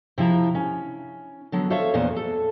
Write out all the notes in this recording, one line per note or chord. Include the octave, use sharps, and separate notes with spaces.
C3 F3 E4 A#5
C#4
D3 F#3 B3
A4 C5 C#5 E5 F5
E2 A#2 A#3 B3 C5
A4